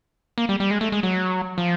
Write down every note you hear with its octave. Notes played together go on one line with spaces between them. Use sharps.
A#3
G3
G3
G#3
A3
G#3
F#3
F3